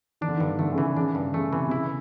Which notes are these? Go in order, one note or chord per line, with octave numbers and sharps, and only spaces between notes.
D#3 D4
D3
D#3
G2
D3 A3
C#3
E3
C#3 D4
G2
C#3 A3
C3 E3
C3
C#3 E4